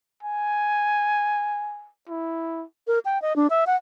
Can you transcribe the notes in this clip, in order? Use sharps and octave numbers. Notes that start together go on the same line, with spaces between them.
G#5
E4
A#4
G5
D#5
D4
E5
F#5